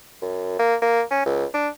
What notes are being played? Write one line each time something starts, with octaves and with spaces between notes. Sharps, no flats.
F#2
A#3
A#3
C#4
C#2
D4